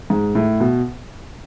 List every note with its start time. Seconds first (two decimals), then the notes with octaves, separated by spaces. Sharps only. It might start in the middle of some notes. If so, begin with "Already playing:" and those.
0.10 G#2
0.35 A2
0.60 B2